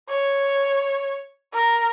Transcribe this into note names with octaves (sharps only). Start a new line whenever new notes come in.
C#5
A#4